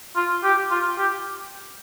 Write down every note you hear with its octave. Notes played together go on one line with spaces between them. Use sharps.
F4
G4
F4
G4